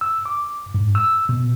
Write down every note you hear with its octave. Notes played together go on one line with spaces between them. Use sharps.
E6
D6
G#2
E6
B2